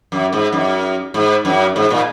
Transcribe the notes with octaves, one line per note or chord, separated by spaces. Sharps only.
F#2
G#2
F#2
G#2
F#2
G#2
A#2